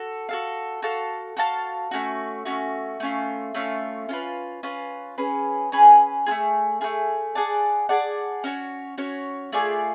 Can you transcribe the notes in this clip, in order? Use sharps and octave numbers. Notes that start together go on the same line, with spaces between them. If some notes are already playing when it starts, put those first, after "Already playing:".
Already playing: F#4 A4
F#4 A4 F5
F#4 A4 F5 A5
F#4 A4 F5 A5
A3 C#4 F#4
A3 C#4 F#4
A3 C#4 F4
A3 C#4 F4
C#4 F4 B4
C#4 F4 B4
C#4 G#4 B4
C#4 G#4 B4
A3 F4 G#4
A3 F4 G#4
G#4 D5 F#5 A5
G#4 D5 F#5 A5
C#4 F#4 C#5
C#4 F#4 C#5
A3 F4 G#4 D5